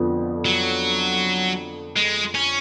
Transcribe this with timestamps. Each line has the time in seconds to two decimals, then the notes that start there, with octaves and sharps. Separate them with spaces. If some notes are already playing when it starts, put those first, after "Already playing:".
Already playing: F2 D3 F3 B3
0.46 F#3
1.96 G#3
2.35 C#4